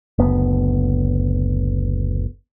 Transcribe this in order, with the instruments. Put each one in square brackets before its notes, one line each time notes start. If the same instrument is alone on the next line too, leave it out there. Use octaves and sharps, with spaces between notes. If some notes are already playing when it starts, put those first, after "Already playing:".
[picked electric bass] F#1 D2 B3